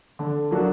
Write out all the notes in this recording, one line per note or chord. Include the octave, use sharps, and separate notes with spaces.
D3
F#3 A#3 D4 F#4